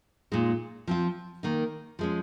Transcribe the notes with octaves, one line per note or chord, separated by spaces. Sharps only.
A#2 G#3 D#4
F3 C4 F4
D#3 A#3 D#4
F3 G#3 C#4